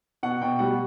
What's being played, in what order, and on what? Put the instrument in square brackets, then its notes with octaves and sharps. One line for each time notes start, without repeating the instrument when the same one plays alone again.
[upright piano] B2 F#5
B2 G5
G3 F#5